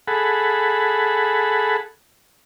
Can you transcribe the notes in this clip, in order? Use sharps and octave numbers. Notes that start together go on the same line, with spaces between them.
G#4 A4 F#5 B5